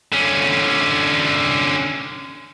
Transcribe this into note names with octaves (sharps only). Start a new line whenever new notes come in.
D3 C#4